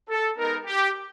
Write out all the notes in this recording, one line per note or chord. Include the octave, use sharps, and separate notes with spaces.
A4
G#3 B3 D#4 A#4
G4